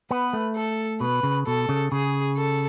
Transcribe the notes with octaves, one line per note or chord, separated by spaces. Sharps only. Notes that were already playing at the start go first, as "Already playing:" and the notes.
B3 B4
A3
A4
B2 B4
C#3
B2 A4
C#3
C#3 G#4
A4